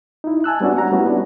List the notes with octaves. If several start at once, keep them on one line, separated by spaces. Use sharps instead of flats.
D#4 E4
G#5 A5 E6 F#6
G3 B3 C#4 D4 F#4
F#5 A#5
G3 A3 B3 C#4 E4 F#4
B3 D4